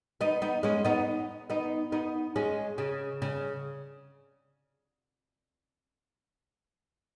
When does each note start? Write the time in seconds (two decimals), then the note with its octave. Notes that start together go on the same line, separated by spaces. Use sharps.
0.21 B3 D#4
0.42 B3 D#4
0.63 G#3 C#4
0.85 B3 D#4
1.50 B3 D#4
1.92 B3 D#4
2.36 G#3 C#4
2.78 C#3
3.22 C#3